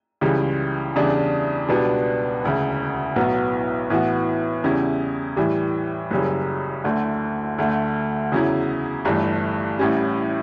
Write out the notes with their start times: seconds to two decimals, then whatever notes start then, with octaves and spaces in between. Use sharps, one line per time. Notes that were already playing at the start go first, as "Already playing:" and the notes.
0.21 C#2 C#3 E3 G3
0.95 E2 C#3 E3 G3 D4
1.69 C#2 B2 G3 B3 D4
2.43 E1 D2 C#3
3.16 B1 A2 F#3 B3 F#4
3.90 A2 E3 B3 F#4
4.64 E2 C#3 G3 C#4 E4
5.37 A2 E3 G3
6.11 F#1 F#2 C#3 G3 C#4
6.84 D2 D3 A3
7.58 D2 D3 A3
8.32 E2 C#3 F#3 C#4 E4
9.05 G1 G2 E3 A3
9.79 A1 A2 G3 C#4